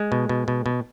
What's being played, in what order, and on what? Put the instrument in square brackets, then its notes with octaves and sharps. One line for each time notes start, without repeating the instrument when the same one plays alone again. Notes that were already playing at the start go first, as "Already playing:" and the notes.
Already playing: [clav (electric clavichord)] G#3
B2
B2
B2
B2